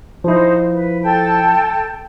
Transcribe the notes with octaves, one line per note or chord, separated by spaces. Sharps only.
F3 D#4 E4 C5
B4
A4 G5 A5